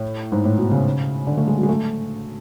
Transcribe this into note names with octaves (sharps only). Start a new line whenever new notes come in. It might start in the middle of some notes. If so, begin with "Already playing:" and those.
Already playing: A2
G#2
A2
B2
C#3
D3
A3
G#3
F#3
G#3
A3